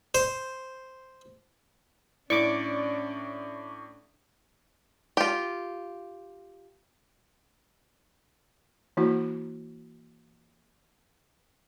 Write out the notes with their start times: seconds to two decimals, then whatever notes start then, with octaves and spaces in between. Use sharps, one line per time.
0.15 C5
2.30 A2 C#4 D4 E4 D5 C#6 D6
5.17 F4 G4
8.97 E3 A#3 E4 F#4